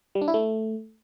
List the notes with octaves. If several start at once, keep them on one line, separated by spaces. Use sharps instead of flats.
G3
D4
E4
A3